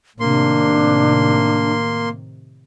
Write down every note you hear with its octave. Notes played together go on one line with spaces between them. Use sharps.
A2 C3 D#3 A#3 D4 C6